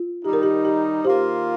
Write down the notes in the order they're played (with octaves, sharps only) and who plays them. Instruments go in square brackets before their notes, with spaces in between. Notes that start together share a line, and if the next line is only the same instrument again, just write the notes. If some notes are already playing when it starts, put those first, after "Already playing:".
Already playing: [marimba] F4
[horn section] D#3 G3 D#4 [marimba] G4
[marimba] A#4
G4
G4
[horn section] D#3 A#3 F4 [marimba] G4 C5